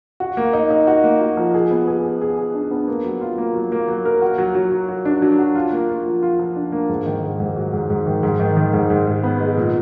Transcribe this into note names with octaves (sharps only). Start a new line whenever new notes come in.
F#4
A#3
D#4
D#4
F#4
A#3
F#4
F3
G#4
B3
G#4
G#4
G#4
G#4
D4
B3
A#3
F#3
F4
A#3
F#3
A#3
F#3
A#4
F#4
F#3
F#3
F#3
F#3
D4
F#3
F#4
F4
A#3
F4
F3
F4
F3
D4
A#3
G#2
D#3
G#2
G#2
F#3
G#2
G#2
D#3
G#2
D#3
D#3
G#2
G#2
G#3
B3
G#3
A#2